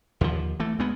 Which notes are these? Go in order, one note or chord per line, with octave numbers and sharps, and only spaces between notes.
D#2 D3 D#3 F3
E3 A3
D2 G#3 B3